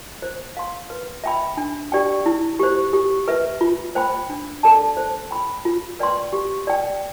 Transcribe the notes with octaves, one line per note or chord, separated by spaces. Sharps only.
C5
F5 C6
B4
E5 G5 B5
D4
G4 D5 G5
E4
G4 C5
G4
B4 E5
F4
C5 G5 B5
D4
A4 D5 A5
C5
G5 B5
F4
B4 D5 G5 C6
G4
D5 G5